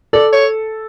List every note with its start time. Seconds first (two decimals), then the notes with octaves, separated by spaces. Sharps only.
0.13 A4 D5
0.33 C#5